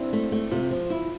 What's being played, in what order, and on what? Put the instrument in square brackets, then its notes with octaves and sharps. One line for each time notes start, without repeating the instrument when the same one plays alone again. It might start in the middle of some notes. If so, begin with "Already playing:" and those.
Already playing: [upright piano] C4 D4 E4 C5
[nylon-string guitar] A3
A3
[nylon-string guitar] C3 [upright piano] F4
[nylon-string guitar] F3
E4